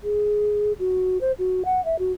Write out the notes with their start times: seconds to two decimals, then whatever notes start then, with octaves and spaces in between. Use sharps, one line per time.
0.03 G#4
0.79 F#4
1.21 C5
1.39 F#4
1.65 F#5
1.85 E5
1.99 F#4